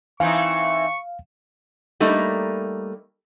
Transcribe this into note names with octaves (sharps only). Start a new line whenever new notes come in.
E3 C4 D#4 F5 C#6
G3 A3 A#3 D#4